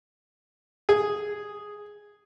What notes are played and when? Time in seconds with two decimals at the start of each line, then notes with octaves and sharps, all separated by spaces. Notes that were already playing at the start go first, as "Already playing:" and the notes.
0.89 G#4